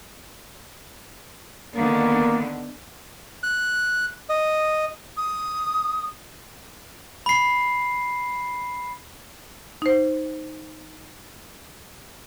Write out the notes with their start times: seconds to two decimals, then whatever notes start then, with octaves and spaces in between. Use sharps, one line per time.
1.76 D3 D#3 A#3 B3
3.43 F#6
4.29 D#5
5.17 D#6
7.26 B5 C7
9.82 D#4 C5